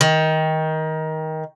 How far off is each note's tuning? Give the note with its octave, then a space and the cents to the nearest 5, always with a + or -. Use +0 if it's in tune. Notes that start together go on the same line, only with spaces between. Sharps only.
D#3 +20